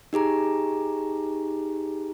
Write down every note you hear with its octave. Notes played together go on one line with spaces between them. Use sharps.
D#4 G4 G#4 A#5